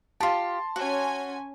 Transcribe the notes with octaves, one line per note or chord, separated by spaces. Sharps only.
F4 G4 A5 C6
C#4 F#4 G#5